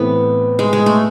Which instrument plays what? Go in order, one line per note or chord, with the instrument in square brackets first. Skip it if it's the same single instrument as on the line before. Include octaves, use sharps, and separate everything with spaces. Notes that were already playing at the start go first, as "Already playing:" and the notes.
Already playing: [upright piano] A2 E3 A3 C4 [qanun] B3
[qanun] G#3
G#3
A3